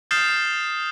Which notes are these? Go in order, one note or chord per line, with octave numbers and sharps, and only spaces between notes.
D#6 F6 G6 A6 C7 E7